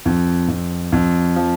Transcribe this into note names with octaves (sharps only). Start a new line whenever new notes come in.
F2
F2
F2
F3